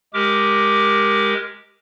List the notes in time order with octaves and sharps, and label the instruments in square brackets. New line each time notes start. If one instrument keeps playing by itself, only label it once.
[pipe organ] G#3 G4 A#4 D6